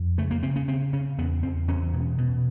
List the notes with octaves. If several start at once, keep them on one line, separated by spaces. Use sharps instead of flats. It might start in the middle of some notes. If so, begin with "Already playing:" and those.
Already playing: F2
C#3 A3
A#3
C#3 C4
C#4
C#3 C4
C#3 C#4
E2 B3
E2 C4
E2 C#4
B2
B2